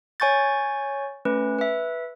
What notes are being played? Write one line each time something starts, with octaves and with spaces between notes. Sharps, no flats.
C#5 G#5 C#6 G6 A6
A3 C#4 B4
B4 E5